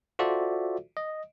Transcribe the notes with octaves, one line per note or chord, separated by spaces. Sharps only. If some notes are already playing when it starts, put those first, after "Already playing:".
F4 F#4 A4 C5 D5 E5
D#5